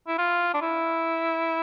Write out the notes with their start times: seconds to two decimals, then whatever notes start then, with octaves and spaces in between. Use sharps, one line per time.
0.07 E4
0.18 F4
0.54 D4
0.61 E4